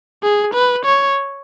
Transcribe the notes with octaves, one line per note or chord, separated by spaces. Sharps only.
G#4
B4
C#5